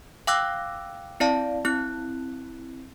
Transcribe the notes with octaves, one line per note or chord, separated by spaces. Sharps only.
F5 G5 D6 E6 F#6 A#6
C4 E4 D5 F5 A5
C4 E4 F#6